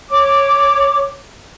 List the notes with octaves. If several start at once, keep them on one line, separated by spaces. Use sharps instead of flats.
C#5 D6